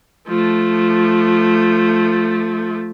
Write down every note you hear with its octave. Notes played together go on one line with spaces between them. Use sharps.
F3 A3